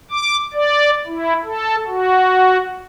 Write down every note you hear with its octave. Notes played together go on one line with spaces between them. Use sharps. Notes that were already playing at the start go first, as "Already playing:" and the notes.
D6
D5
E4
A4
F#4